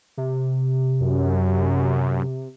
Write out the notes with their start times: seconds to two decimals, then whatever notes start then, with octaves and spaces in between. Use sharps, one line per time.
0.17 C3
1.01 F#2